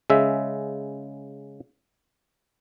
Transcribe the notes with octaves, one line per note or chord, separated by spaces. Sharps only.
C#3 G#3 E5